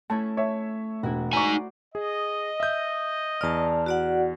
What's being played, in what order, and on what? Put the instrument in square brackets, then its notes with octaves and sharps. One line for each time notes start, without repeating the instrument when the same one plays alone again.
[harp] A3 C#4 E4 [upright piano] A5
[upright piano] C#5 E5
[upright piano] E1 [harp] E4 F#4
[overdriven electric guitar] D#4 G#5 [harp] C5 D5 [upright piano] A#5 C#6
[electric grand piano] G#4 [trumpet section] D#5
[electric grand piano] E5 G6
[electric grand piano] E2 F6 [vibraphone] D5 A5
[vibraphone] F#4 D5 F#5